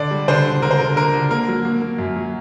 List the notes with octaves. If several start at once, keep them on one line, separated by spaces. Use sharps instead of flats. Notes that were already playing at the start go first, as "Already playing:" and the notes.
Already playing: D3 D5
G3
D3 C5
D3
D3 A#4
C5
D3 A#4
D3 A#4
D3
A#3 A#4
F#3
A#3
A#3
F#2
F#3